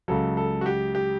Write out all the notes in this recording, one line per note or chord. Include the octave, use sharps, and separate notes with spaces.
C#2 C#3 F#3 A4
A4
F#4
G4
G4